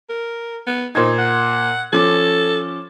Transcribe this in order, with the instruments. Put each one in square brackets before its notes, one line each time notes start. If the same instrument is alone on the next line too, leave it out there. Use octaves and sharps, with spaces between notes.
[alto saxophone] A#4
B3
[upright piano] A#2 C5 G#6 [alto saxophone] D#4
[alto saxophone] F#5
[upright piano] F3 C#4 D6 [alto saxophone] A4